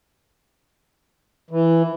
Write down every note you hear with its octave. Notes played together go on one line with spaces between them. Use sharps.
E3